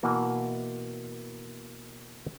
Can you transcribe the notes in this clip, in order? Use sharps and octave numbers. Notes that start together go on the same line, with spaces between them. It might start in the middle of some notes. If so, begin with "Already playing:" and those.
B2 E3 A#3 F#4